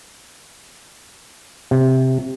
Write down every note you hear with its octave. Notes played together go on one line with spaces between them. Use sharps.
C3